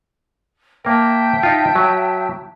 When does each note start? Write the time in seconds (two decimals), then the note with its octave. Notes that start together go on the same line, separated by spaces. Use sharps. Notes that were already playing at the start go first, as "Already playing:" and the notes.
0.85 A#3 A#4 E5 G5 A5
1.43 D#4 F4
1.75 F#3